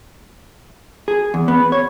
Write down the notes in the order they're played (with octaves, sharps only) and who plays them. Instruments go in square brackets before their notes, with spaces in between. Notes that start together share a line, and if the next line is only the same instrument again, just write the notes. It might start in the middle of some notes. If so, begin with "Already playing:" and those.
[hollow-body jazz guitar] G#4
E2
B3
C#5